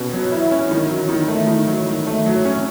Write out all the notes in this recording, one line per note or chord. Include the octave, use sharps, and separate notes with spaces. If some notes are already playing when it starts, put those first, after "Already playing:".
Already playing: B2 C#4
F#3
E4
C#4
D#3
F#3
D#3
A3
D#3
F#3
D#3
A3
F#3
C#4